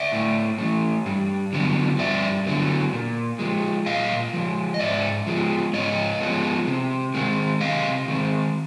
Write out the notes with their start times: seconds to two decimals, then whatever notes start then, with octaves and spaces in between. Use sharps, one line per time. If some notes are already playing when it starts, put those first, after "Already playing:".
Already playing: D5 E5
0.12 A2
0.58 E3 A3
1.06 G2
1.53 D3 F#3 B3
1.99 G2 D5 E5
2.47 D3 F#3 B3
2.93 A#2
3.39 F3 G#3
3.86 A#2 D#5 F5
4.33 F3 G#3
4.74 D#5
4.79 G#2 D5 E5
5.27 F3 G#3 B3
5.73 G#2 C#5 D#5
6.21 F3 G#3 B3
6.67 C3
7.14 D#3 G#3 C4
7.60 C3 D#5 F5
8.08 D#3 G#3 C4